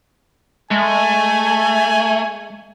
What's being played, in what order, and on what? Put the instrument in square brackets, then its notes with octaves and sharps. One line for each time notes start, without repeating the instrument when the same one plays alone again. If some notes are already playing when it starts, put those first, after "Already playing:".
[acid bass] G#3 [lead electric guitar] A3 [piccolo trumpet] G#5